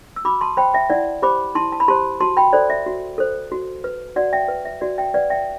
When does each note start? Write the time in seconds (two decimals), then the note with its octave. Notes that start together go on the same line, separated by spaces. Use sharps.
0.16 E6
0.25 F#4 B5 D6
0.41 A5 C6
0.57 C5 G5 B5
0.74 E5 G5
0.90 E4 D5 F#5
1.22 G4 C5 B5 D6
1.55 E4 A5 C6
1.72 A5
1.80 B5
1.88 G4 C5 A5 C6
2.20 F#4 A5 C6
2.37 G5 B5
2.53 A4 C5 D5
2.70 E5
2.86 F#4
3.18 A4 C5
3.52 F#4
3.84 B4
4.16 F#4 D5 F#5
4.33 E5 G5
4.48 B4
4.65 E5
4.81 F#4 D5
4.98 E5 G5
5.14 B4 D5 F#5
5.30 E5 G5